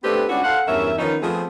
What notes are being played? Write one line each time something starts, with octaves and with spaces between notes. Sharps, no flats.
A3 B3 C4 D4 G4 B4
G#3 C#4 D4 E4 F#4
A4 C5 F5 F#5
E2 G2 C#4 A#4 E5
D#3 F3 B3 C#4 D#4
F3 A3 B3 C4 G#4